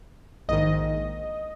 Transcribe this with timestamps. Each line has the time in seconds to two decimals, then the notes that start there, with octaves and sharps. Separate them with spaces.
0.49 A#1 G#2 D#3 D#5